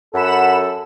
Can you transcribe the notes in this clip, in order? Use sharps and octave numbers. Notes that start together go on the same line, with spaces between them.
F#2 A4 F#5 B5 E7